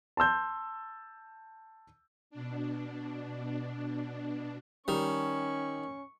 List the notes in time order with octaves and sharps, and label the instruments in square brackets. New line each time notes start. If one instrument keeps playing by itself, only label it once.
[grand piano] A5 C6 E6 G6
[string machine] B2 D4
[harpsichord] D#3 [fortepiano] G3 [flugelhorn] C#4 [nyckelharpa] C#6